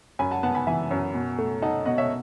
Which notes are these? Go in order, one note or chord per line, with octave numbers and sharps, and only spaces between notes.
F#2 G#5 B5
F#5 A5
B3 F#5 A5
G#5 B5
E3 E5 G#5
F#2
B2
A3
D#4 F#5 A5
B2 D#5 F#5
C#5 E5